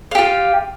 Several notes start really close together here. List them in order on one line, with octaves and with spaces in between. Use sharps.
F5 G4 F4